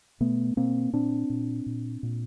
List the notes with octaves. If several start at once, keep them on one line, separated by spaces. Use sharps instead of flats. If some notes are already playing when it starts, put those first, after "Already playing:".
B2 A3 B3
B2 A#3 C4
A#2 C4 D4
A#2
A#2
A#2